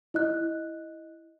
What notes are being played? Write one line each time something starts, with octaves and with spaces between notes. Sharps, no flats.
E4 D#5 F#6